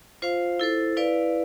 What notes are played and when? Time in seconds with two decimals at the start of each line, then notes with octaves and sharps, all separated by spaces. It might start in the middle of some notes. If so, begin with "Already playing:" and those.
0.22 F4 C5 F5
0.60 E4 A4 C5
0.97 E4 B4 D5 F5